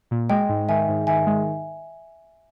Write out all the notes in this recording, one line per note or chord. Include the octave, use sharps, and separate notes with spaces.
A#2
G#3 D#5 G5
G#2
D#3 E5 G#5
G#2
D#3 E5 G#5
G#3